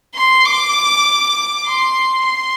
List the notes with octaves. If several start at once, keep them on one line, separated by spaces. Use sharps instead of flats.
C6
D6
C6
C6